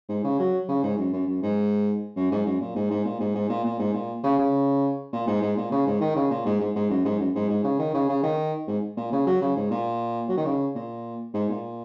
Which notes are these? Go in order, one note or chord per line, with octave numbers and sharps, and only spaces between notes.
G#2
C#3
F#3
C#3
G#2
F#2
F#2
F#2
G#2
F#2
G#2
F#2
A#2
G#2
G#2
A#2
G#2
G#2
A#2
A#2
G#2
A#2
C#3
C#3
A#2
G#2
G#2
A#2
C#3
G#2
D#3
C#3
A#2
G#2
G#2
G#2
F#2
G#2
F#2
G#2
G#2
C#3
D#3
C#3
C#3
D#3
G#2
A#2
C#3
F#3
C#3
G#2
A#2
F#3
D#3
C#3
A#2
G#2
A#2